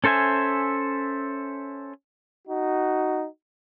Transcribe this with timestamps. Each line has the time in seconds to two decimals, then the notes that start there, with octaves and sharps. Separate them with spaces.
0.04 C#4 A4 C5 E5 G#5
2.48 D#4 F#4